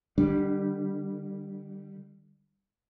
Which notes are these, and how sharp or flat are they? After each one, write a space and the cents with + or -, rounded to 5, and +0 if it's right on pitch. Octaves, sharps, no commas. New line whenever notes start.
D3 +40 G3 +0 D4 +0